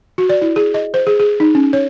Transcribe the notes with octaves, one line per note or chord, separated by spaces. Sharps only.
F#4
D5
E4
G#4
D#5
C5
G#4
G#4
D#4
C#4
C#5